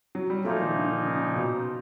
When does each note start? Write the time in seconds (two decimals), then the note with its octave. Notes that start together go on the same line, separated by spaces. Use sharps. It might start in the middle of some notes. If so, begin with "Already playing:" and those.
0.15 F#3
0.30 G3
0.44 A#2 F3 A3 A#3 D#4
0.60 D#3
0.76 D3
0.91 D#3
1.05 C#3
1.16 C#3
1.35 B2